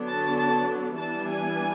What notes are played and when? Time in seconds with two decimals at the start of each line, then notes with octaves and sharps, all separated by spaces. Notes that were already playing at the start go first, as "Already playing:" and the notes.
Already playing: D3 F#3 B3 D4
0.08 A5
0.38 A5
0.97 E3 G3 B3 D4 A5
1.27 G#5